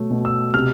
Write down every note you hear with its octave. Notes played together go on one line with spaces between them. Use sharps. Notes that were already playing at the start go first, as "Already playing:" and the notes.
Already playing: B2 F#3 A3
B2
E6
C3 F6